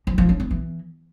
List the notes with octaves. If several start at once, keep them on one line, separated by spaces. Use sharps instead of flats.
F3
F3
C#4
B3
E3